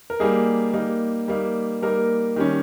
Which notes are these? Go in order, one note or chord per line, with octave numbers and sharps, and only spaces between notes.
A#4
G3 A#3 D#4 G#4
G3 A#3 D#4
G3 A#3 D#4
G3 A#3 D#4 A#4
D#3 G3 C#4